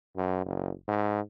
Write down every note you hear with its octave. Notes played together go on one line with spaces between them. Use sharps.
F#2
F#1
G#2